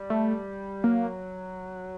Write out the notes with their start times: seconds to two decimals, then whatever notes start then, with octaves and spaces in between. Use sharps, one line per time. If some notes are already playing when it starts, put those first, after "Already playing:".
Already playing: G3
0.10 A3
0.84 F#3 A#3